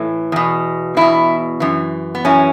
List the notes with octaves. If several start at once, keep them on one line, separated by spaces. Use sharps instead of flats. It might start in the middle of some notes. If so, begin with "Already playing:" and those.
Already playing: A2 E3
E2 B2
E2 B2 E4
F#2 E3
B3
F#2 E3 C#4